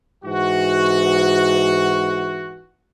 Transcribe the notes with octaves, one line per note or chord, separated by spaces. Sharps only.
G#2 E3 F#4